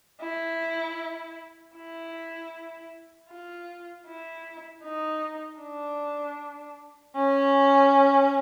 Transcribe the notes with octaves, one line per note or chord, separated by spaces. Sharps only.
E4
E4
F4
E4
D#4
D4
C#4